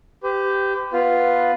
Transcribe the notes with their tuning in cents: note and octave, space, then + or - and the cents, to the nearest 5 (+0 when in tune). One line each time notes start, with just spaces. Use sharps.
G4 +0 B4 +40
B3 +0 F4 +0 B4 +0